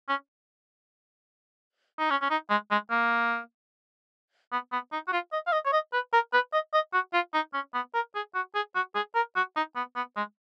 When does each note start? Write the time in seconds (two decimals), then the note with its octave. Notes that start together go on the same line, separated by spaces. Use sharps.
0.09 C#4
1.99 D#4
2.10 C#4
2.22 C#4
2.30 D#4
2.50 G#3
2.71 G#3
2.91 A#3
4.52 B3
4.72 B3
4.92 D#4
5.08 F#4
5.12 F4
5.33 D#5
5.47 F5
5.52 D#5
5.65 C#5
5.73 D#5
5.93 B4
6.13 A#4
6.33 B4
6.53 D#5
6.74 D#5
6.93 F#4
7.13 F4
7.34 D#4
7.54 C#4
7.74 B3
7.94 A#4
8.15 G#4
8.35 F#4
8.55 G#4
8.75 F#4
8.95 G#4
9.15 A#4
9.36 F#4
9.56 D#4
9.76 B3
9.96 B3
10.16 G#3